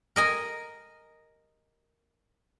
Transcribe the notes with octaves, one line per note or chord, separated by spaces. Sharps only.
A#4 D#5 G#5